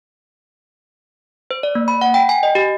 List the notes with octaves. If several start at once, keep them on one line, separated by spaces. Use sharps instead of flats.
C5
D5
A#3
B5
F#5
G5
G#5
D#5
G4